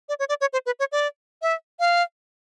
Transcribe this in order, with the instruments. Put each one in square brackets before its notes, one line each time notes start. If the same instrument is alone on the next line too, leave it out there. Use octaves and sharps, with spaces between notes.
[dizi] D5
C#5
D5
C#5
C5
B4
C#5
D5
E5
F5